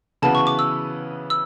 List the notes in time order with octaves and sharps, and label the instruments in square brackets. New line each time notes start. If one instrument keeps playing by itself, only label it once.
[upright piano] C#3 E3 B3 F#4 B4 [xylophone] A5
[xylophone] C#6
D6
E6
E6